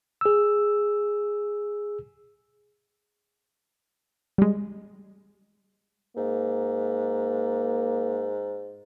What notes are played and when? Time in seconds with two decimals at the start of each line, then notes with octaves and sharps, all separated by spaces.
0.21 G#4 E6
4.38 G3 G#3
6.17 G#2 A#3